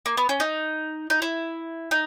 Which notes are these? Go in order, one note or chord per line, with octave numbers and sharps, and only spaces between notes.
A#3
B3
C#4
D#4
D#4
E4
D#4